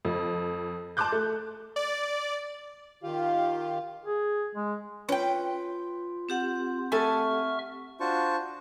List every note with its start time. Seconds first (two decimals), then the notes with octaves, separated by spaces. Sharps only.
0.05 F2
0.97 A5 C6 D6 F#6 G6
1.12 A3
1.76 D5
3.03 D#3 F4 G4 F5
4.05 G#4
4.55 G#3
5.09 C#4 F4 B4 G5
6.29 C4 G4 F#5
6.92 A3 A4 E5 G#5 C#6 F6
8.00 D4 F4 F#4 C5 A5 C#6